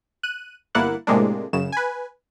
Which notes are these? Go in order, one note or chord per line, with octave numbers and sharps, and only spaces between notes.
F#6 D#7
G1 A#3 E4 F#5 F#6 A6
A2 C3 G#3 A#3 D4
F#2 C#3 E7
B4 G#5